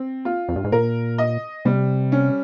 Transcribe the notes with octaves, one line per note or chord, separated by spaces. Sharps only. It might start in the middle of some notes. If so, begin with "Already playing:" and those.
Already playing: C4
F4
F2
G2
G#2
A#2 A#4
D#5
C3 G3
C#4